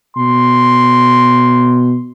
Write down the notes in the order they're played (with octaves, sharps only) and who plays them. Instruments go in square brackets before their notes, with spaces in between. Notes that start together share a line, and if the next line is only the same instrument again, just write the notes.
[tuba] B2 [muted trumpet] C6